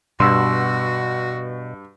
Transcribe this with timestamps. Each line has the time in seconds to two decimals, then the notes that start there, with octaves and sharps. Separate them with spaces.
0.20 G2 B2 F#4 C6 E6